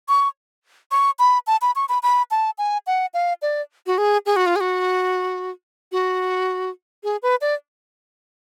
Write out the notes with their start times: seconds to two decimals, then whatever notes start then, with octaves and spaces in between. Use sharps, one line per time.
0.09 C#6
0.91 C#6
1.19 B5
1.47 A5
1.62 B5
1.76 C#6
1.89 B5
2.03 B5
2.31 A5
2.58 G#5
2.87 F#5
3.14 F5
3.42 D5
3.87 F#4
3.98 G#4
4.26 G#4
4.36 F#4
4.46 F4
4.56 G#4
4.61 F#4
5.92 F#4
7.04 G#4
7.23 B4
7.41 D5